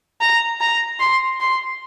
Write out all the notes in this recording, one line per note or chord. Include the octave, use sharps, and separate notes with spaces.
A#5
A#5
C6
C6